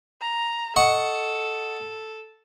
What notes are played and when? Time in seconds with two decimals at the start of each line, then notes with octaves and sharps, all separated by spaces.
0.21 A#5
0.76 A4 D#5 F#5 C#6